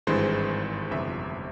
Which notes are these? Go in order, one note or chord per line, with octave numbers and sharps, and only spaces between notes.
G#1 G2 E3 G#3 C5
G1 F2 C3 E5